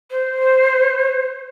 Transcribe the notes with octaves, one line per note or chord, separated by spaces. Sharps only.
C5